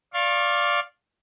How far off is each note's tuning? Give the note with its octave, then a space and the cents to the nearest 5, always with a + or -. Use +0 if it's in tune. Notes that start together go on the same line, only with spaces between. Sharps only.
D5 -5 F5 +0 C#6 -45